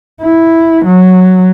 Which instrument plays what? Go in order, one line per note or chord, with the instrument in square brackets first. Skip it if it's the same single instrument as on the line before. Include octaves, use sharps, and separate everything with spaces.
[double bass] E4
F#3